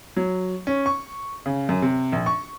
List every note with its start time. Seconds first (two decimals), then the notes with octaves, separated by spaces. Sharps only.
0.17 F#3
0.67 C#4
0.86 C#6
1.46 C#3
1.69 F#2
1.82 C3
2.13 A#1
2.26 C#6